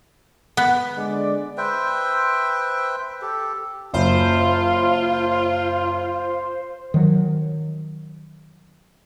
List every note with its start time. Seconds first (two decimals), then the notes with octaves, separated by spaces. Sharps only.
0.57 B3
0.97 D3 G#3 D5
1.57 B4 C5 E5 G5
3.22 G4 A4
3.94 F#1 F4 C5
6.94 D#3 F#3